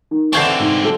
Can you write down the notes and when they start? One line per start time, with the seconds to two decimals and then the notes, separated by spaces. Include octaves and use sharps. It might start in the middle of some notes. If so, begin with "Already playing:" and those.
0.11 D#3
0.33 D3 E3 C4 D4 A5 C#6 G6 C7
0.59 G#2
0.82 F#3 A4